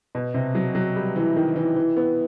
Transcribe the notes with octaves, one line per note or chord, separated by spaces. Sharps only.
B2
C3
F#3
F#3
G3
E3
D#3
E3
E3
B3